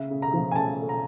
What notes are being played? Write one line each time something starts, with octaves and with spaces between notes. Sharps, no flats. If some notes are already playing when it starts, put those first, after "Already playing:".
Already playing: C#3 E5
C#3
A#5
F3
G#5
C#3 A5
A3
A#5